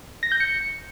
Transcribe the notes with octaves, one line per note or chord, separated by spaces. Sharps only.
A#6
G6
C#7